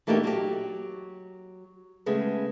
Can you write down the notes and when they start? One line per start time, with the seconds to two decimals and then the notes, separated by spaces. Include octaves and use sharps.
0.07 E3 A3 A#3 D4 D#4 G4
0.24 F#3 G4
2.06 C#3 G#3 A3 B3